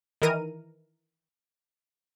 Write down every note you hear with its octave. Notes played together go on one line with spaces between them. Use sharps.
D#3 E3 A#4 D#7